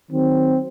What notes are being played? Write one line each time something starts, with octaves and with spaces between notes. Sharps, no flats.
D#3 F#3 C4